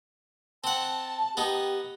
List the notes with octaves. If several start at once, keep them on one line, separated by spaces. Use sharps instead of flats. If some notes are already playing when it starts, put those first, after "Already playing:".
C4 F#5 A5
B3 D#4 G4